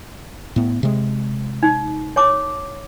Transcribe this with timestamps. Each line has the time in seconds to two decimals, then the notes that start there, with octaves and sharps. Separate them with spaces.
0.56 A2 B3
0.83 C3 G#3
1.63 D#4
2.16 C#5 A5 D6